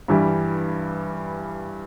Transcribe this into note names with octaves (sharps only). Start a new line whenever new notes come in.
G2 E3 G3